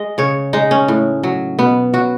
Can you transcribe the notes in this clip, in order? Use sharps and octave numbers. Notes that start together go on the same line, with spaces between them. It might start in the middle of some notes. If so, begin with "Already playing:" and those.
Already playing: G#3 G#4 D#5
C#3 C#5
G#3 D#4
C#4
A2
F#3
B2 B3
F#3 F#4